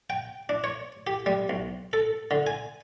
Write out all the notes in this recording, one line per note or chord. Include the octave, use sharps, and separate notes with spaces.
G5
D4
C#5
G4
G3
B1
A4
D3
G#5